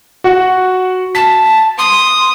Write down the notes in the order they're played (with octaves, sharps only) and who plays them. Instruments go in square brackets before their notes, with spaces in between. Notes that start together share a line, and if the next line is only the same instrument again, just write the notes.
[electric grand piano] F#4 F#5
[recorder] A5 [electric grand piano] B6
[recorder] C6 [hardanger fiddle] D#6